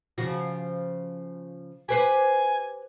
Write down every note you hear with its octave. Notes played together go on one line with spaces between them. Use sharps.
C#3 F3 F#4
G4 B4 C5 G#5